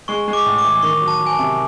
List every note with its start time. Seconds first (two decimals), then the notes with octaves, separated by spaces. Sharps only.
0.08 G#3 C#6
0.28 G#3
0.33 D6
0.46 A2
0.58 D6
0.64 E3
0.82 D#3 C#6
1.01 F#3
1.08 A5
1.20 F#3
1.26 G#5
1.32 A5
1.39 C3